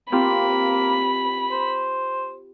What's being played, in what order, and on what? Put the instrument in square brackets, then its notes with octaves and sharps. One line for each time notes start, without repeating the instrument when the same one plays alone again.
[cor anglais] A#3 [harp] C4 F4 G4 [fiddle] B5
[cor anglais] C5